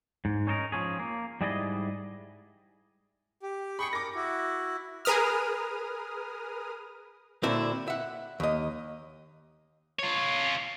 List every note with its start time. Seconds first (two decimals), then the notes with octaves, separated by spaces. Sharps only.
0.25 G#2
0.47 C#4 D#4 A4 A#4
0.72 F3 C#4 G#4
1.00 A#3
1.41 G#2 G3 E4 G#4 D5 D#5
3.43 G4
3.79 G#4 G5 B5 C#6 C#7
3.93 A#4 D6 A#6
4.15 E4 F#4
5.05 G#4 A#4 B4 D#6 F6
7.43 A#2 D3 C4 E4 F#4
7.88 E5 F#5
8.40 D#2 D#5
9.99 F4 C#5